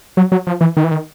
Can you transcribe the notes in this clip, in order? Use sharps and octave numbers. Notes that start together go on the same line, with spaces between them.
F#3
F#3
F3
E3
D#3
E3
D#3